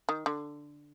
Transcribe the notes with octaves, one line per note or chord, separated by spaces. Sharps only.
D#3
D3